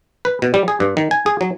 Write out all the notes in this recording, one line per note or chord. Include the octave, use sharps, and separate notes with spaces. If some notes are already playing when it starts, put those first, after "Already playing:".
B4
B2
G3
G#4
G2
D#3
G#5
G#4
F#3